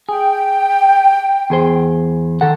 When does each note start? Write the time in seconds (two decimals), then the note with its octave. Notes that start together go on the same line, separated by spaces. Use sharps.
0.09 G#4 G5
1.50 E2 G#4 C5
2.41 D#3 A4 F#5